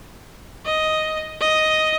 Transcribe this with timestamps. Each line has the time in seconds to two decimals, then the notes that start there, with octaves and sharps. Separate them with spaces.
0.65 D#5
1.41 D#5